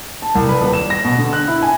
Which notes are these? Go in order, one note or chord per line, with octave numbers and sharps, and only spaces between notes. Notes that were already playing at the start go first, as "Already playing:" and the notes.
A5
C2
B4
D#1
E7
A#6
B2
D3
F#6
E4
G#5